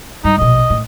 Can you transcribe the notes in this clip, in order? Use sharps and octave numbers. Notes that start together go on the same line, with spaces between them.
G2 D#4
A#1 B2 D#5
A2